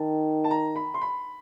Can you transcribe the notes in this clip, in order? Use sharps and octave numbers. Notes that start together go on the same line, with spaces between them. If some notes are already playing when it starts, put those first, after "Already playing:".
Already playing: D#3 A5
A5
A#5
B5
C6
B5